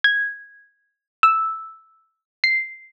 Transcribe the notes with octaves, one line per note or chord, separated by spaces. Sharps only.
G#6
E6
C7